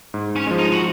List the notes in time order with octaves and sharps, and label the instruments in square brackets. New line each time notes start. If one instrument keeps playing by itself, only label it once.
[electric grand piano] G#2
[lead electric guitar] C#4
[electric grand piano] F3 G#3
[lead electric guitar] D#4
F#4